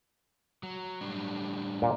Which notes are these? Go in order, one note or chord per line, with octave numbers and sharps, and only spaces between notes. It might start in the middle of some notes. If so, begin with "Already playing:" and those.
F#3
A2 G3 D4
A#2